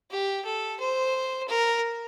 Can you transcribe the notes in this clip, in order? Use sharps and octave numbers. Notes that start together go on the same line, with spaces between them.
G4
A4
C5
A#4